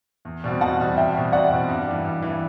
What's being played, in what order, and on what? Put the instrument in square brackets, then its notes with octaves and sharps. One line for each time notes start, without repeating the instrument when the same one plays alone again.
[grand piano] E2
B2 G3 C4 F#4
[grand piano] E2 [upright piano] F#5 A5
[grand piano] B2 G3 C4 F#4
[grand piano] E2 [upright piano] E5 G5
[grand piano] B2 G3 C4 F#4
[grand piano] E2 [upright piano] D5 F#5
[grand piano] B2 G3 C4 F#4
G2
E3 G3
G2
E3 G3